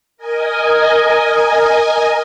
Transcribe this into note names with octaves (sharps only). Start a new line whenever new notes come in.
A#4 D#5 G#5